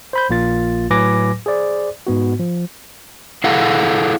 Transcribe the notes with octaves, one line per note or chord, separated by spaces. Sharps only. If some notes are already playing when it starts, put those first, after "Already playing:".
C5 B5 G6
A#1 A#3 F4 A6
A2 F#3 B4 G#5 D6 A#6
G#4 C5 D5
G#2 B3 F#4
F3
E4 G#4 A4 F5 F#5